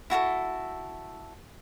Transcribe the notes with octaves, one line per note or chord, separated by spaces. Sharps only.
E4 F#4 G4 A4